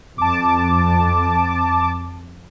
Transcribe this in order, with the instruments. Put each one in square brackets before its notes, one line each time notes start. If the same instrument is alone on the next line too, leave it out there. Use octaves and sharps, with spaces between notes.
[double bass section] F2 [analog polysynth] A5 D6